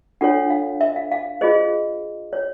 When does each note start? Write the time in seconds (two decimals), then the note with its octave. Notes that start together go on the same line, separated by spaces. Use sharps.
0.21 D4 F4 A4 C#5 F#5
0.50 F5
0.81 E5
0.96 F5
1.12 F5
1.41 F4 G#4 C5 D#5
2.33 C#5